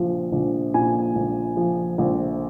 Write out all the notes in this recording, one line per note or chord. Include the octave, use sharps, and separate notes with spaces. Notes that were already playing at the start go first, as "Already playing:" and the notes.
Already playing: A#1 A#2 F3
A#1
A#2 G#5
A#1
F3
A#1